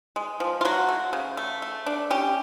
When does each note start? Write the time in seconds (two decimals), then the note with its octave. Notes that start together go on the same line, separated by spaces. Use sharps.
0.16 G#3
0.40 F3
0.61 F4
0.65 F#3 F#4
0.88 A3
1.13 C#3
1.37 A3
1.62 A3
1.86 D4
2.10 C#4 G4